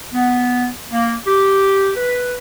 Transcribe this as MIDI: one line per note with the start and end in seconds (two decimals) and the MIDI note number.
0.14 0.67 59
0.92 1.13 58
1.27 1.90 67
1.97 2.38 71